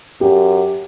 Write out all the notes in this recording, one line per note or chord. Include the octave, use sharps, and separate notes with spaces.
F#2 G4